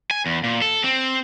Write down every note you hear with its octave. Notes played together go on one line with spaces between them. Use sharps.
G#5
E2
A#2
A4
C4